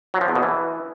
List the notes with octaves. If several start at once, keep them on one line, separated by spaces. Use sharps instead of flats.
F#3
F3
E2
B2
E3